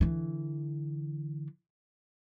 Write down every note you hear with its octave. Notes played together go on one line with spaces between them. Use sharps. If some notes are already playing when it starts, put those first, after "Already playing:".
D3 E3